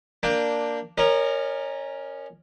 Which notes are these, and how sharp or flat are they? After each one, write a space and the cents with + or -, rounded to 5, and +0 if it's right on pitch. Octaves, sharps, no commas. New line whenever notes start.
A#3 +0 D4 +0 G5 +20
C#4 -5 A#4 +0 D#5 -40